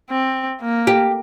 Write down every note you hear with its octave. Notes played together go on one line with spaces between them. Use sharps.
C4
A#3
G4